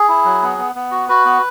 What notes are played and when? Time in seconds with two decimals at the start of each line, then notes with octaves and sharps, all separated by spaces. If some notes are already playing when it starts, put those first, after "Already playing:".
Already playing: G#4
0.09 E4
0.25 F#3
0.42 B3
0.58 B3
0.75 B3
0.91 F#4
1.09 F#4 B4
1.25 B3